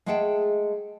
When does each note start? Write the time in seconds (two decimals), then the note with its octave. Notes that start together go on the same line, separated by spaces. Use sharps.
0.06 G#3 A3 G#4 F#5 G5 A5